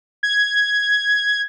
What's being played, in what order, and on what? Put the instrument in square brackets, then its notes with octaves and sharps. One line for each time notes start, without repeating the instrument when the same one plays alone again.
[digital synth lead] G#6